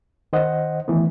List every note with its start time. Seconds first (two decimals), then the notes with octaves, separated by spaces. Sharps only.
0.33 D#3 C5 D#5 F#5
0.88 D#3 E3 A3 B3